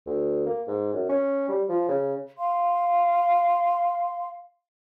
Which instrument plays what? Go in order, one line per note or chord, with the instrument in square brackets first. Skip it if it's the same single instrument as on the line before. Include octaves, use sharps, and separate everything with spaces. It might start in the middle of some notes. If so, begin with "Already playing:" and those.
[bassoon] D2
A#3
G#2
F#2
C#4
G3
F3
C#3
[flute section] F5 C6